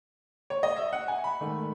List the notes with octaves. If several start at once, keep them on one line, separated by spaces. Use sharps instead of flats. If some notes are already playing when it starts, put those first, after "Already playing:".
C#5
D#5
E5
F#5
G#5
B5
G#2 D#3 A3